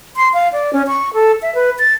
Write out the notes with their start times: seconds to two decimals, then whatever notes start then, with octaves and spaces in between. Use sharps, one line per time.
0.16 C6
0.34 F5
0.53 D5
0.73 C#4
0.88 C#6
1.14 A4
1.42 E5
1.55 B4
1.79 A6